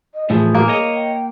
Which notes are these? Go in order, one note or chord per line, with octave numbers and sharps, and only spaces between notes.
D#5
A2 E3 F3 G#4
A#3
C#5 D#5
G5